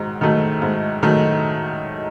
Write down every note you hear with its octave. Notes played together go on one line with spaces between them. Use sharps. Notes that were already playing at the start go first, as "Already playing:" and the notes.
Already playing: G#2 D#3 F#3
D#3 F#3 A3
G#2
D#3 F#3 A3